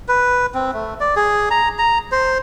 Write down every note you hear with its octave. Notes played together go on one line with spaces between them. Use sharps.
B4
C4
A3
D5
G#4
A#5
A#5
C5